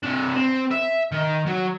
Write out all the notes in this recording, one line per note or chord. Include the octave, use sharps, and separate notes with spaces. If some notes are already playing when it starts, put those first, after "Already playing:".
C3 D4
C4
E5
D#3
F#3